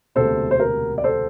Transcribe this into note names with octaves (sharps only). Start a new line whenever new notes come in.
E1 D2 C3 A4 C5
C5
A#4
D5
A4 C5